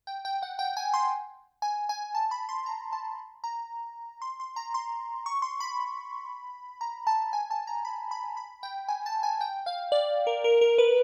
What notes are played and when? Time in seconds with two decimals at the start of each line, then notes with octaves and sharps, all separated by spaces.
0.07 G5
0.25 G5
0.42 F#5
0.59 G5
0.77 G#5
0.94 C6
1.62 G#5
1.89 G#5
2.15 A5
2.31 B5
2.49 C6
2.66 A#5
2.93 A5
3.44 A#5
4.22 C6
4.40 C6
4.56 A#5
4.74 C6
5.26 C#6
5.42 C6
5.60 B5
6.81 A#5
7.07 A5
7.33 G#5
7.51 A5
7.67 A#5
7.85 B5
8.11 B5
8.37 B5
8.63 G5
8.88 G#5
9.06 A5
9.23 G#5
9.41 G5
9.66 F5
9.92 D5
10.27 A#4
10.44 A#4
10.61 A#4
10.78 B4